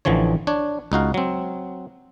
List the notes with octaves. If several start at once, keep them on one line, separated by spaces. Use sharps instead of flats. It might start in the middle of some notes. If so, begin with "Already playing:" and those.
A1 D3 E3 F3 C#5
D4 C#5
C#2 D#4 F#4 F5
F#3 C4